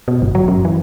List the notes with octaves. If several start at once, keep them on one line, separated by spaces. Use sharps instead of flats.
B2
G1
F#3
F#2
E3